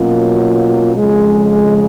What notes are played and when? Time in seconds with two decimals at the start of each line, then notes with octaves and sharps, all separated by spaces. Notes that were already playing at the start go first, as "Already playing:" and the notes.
Already playing: B2 F#3 A#3 C#4 F4
0.96 F2 C#3 G#3